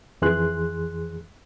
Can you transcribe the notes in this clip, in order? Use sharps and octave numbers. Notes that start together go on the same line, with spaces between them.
F2 E3 G#4 C6 F#6